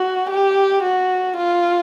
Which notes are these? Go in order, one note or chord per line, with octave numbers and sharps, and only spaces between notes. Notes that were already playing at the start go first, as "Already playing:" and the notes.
Already playing: F#4
G4
F#4
F4